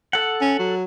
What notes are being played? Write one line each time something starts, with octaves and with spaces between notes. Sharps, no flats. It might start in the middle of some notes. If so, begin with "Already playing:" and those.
A4 F#5
C#4
F#3